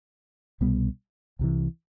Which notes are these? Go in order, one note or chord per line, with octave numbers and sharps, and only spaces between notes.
C2 B2 G3 B3
C2 C3 E3